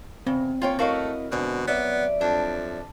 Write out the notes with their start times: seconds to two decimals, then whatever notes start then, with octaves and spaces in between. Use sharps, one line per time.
0.27 E2 C#3 C4
0.62 A#3 C#4 F4 C#5 G5
0.79 A3 E4 F#4 A#4 D#5 F5
1.32 E2 G#2 B2 D3
1.67 F#3 B3 D5 E5
2.21 F2 D4